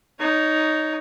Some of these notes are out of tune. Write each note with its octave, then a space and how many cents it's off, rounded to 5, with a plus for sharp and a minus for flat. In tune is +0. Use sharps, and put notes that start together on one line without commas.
D#4 +0 C#5 +20